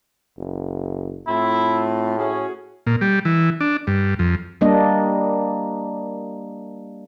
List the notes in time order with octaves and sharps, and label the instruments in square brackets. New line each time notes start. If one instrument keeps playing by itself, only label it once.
[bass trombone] F#1
[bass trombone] A2 [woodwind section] A3 C4 F4 [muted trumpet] E4
[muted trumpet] C#4 [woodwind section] F#4 G#4
[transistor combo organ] A#2
G3
E3
D4
G2
F2
[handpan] G3 A#3 D4 D#5